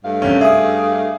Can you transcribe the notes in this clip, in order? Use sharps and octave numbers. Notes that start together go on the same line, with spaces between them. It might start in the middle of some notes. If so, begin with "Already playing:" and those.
G2 A3 F5
F#2 C3 C#4
G#4 E5 D#6